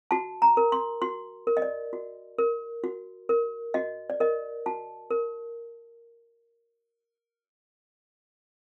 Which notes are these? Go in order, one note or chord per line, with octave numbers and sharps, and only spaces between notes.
F#4 A5
A#5
A#4
C6
F#4 C6
A#4
D#5
D5
F#4
A#4
F#4
A#4
F#4 D#5
D5
A#4 D#5
F#4 A5
A#4